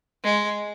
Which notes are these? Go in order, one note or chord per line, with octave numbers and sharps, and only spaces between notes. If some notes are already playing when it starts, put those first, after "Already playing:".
G#3